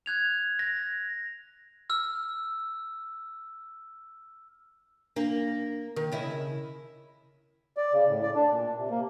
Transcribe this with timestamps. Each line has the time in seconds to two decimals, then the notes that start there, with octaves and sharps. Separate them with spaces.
0.06 F#6 G#6 F7
0.59 A#6
1.90 E6 F6
5.16 A#3 D4
5.96 D#3 A#4
6.12 C#3 E4 D#5
7.77 D5
7.93 C#3
8.08 A2
8.23 D5
8.35 D4
8.50 A#2
8.77 C3
8.90 A#3